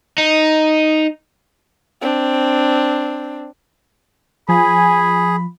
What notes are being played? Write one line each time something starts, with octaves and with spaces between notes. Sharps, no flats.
D#4
C4 D4
F3 G#4 G#5 B5